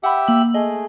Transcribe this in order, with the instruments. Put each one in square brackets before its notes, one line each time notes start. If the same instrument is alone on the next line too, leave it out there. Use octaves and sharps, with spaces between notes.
[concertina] G4 E5 [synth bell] F#5 B5
[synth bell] A#3 E6 F#7
[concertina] A3 G#4 [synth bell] D#5